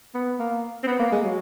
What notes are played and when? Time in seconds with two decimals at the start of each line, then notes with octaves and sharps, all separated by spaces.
0.14 B3
0.39 A#3
0.83 C4
0.87 B3
0.99 A#3
1.12 G#3
1.24 F#3